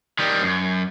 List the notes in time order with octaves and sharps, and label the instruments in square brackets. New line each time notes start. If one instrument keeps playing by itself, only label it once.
[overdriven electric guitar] D#3 G3
F#2